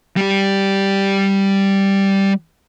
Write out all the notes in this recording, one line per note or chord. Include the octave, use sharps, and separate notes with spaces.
G3 G4